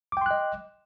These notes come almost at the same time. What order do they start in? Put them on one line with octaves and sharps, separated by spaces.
D6 G5 C6 F#6 D#5